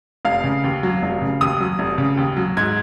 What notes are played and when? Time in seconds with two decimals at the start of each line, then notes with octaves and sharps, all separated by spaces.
0.25 F1 F5
0.44 C#3
0.64 D#2
0.83 F#3
1.02 F1
1.22 C#3
1.41 D#2 D#6
1.60 F#3
1.79 F1
1.98 C#3
2.17 D#2
2.37 F#3
2.57 G#2 G#6